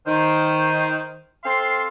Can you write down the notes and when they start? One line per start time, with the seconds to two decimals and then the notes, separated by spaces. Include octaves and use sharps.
0.07 D#3 C5
1.45 C4 A4 F5 C6